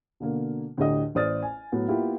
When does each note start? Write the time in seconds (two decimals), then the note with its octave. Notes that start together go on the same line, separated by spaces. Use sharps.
0.20 B2 D3 A#3
0.77 D2 A2 D3 G4 D#5 D#6
1.15 A1 C5 D5 D#6 F6 A6
1.42 G#5
1.72 A2 F#3 B3
1.88 A#3 B3 E4 F4 G4